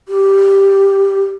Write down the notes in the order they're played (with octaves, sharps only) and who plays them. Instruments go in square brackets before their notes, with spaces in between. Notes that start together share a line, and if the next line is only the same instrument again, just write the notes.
[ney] G4